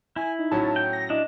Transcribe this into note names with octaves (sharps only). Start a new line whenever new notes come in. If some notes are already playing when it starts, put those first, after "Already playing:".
E4 G#5
D#4
A2 F#3 C#4 A5
G5
A#6
D4 E4 D#5